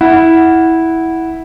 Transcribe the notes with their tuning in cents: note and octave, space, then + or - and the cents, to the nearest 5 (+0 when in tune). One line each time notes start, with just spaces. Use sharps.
E4 -10 F#5 +0